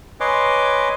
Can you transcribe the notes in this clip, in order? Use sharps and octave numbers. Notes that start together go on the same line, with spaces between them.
B4 C#5 D#5 G#5 C6 D6